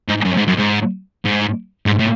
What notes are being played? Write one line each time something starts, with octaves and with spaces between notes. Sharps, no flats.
G#2
F#2
G#2
F#2
G#2
G#2
G#2
A2